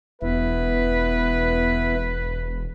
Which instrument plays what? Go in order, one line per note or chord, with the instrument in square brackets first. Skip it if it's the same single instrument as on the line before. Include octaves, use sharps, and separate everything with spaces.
[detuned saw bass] E1 [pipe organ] B3 E4 [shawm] B4